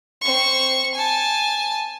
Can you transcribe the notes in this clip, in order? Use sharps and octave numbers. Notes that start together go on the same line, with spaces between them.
C4 C#6
G#5 A5